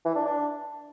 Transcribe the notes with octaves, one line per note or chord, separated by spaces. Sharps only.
E3
D4
D4